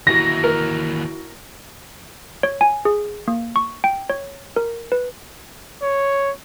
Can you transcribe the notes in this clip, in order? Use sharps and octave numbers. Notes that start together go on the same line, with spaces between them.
D#2 E3 E4 F#4 A#6
A#4
C#5
G#5
G#4
A#3
C#6
G5
C#5
A#4
B4
C#5